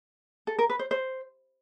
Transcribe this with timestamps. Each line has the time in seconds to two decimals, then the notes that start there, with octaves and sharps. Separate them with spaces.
0.47 A4
0.59 A#4
0.70 B4
0.79 C5
0.91 C5